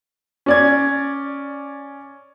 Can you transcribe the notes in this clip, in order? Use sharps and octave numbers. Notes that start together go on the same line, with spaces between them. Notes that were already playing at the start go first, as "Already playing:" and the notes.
C#4 D5 G#6